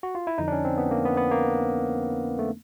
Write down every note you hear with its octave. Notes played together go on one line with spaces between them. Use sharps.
F#4
F4
E4
F2 D3 F3 D#4
D4
C#4
C4
B3
A#3
B3
B3
A#3
A3